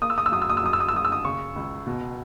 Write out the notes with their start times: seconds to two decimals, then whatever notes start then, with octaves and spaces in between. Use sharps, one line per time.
0.02 A#3 D#6
0.10 E6
0.18 D#6
0.26 E6
0.32 F#2 D#6
0.42 E6
0.49 D#6
0.57 E6
0.64 F#2 D#6
0.73 E6
0.80 D#6
0.88 E6
0.94 F#2 D#6
1.05 E6
1.12 D#6
1.25 C#3 C#6
1.56 C#2
1.87 B2